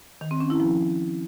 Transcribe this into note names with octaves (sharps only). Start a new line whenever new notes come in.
D#3
C4
C#4
E4
F3